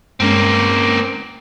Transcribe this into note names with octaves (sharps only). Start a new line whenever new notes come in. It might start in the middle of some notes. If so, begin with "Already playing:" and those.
G2 G#3 A#3 C4 C#4